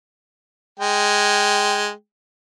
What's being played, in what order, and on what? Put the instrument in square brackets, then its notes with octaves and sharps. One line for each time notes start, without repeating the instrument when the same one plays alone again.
[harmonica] G#3 G5